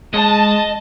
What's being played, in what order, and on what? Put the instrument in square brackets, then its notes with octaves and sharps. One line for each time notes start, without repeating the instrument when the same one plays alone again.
[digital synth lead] G#3 [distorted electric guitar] D#5 [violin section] A5